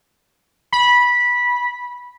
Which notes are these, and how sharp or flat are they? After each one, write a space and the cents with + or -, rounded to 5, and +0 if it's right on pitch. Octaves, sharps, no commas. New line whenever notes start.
B5 -15